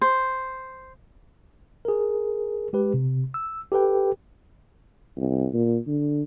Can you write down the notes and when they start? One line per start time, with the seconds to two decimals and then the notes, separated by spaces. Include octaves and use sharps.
0.01 C5
1.85 G#4 A#4
2.73 G#3 G4 B4
2.94 C3
3.34 E6
3.72 G4 A4 B4 G5
5.17 C2
5.54 A#2
5.87 D3